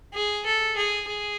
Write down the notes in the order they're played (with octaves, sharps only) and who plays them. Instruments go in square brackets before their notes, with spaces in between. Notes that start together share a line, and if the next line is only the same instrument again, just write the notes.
[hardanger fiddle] G#4
A4
G#4
G#4